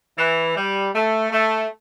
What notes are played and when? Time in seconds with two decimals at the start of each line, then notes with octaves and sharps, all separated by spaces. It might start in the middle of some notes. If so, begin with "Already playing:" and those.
0.17 E3
0.55 G3
0.94 A3
1.31 A3